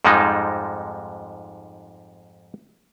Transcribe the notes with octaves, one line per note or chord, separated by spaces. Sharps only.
F2 G#2 F3 G3 G#3 D#4